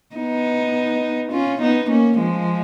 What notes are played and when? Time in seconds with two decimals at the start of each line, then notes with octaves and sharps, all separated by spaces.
0.16 B3 D#4
1.31 C#4 F4
1.61 B3 D#4
1.90 A#3 C#4
2.18 F3 G#3